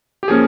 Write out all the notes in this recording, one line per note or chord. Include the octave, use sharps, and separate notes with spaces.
G4
F3 A#3 C#4 G#4